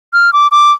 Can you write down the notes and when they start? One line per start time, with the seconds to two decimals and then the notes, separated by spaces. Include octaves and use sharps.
0.13 F6
0.33 D6
0.51 D6